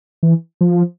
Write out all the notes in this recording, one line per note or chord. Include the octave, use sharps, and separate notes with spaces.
E3
F3